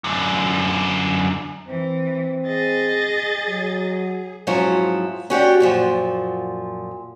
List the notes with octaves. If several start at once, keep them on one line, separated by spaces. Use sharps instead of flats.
F#2 D3
E3 C4
G#4 D#5 A6
F#3
G#2 F3 F#3 C#4 E4
C#4 F#4 G4 D5
F#2 A#2 F3